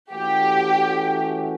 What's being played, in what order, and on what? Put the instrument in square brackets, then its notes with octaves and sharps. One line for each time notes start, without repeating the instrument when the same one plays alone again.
[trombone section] E3 A3 C#4 F#4 A4 [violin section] G4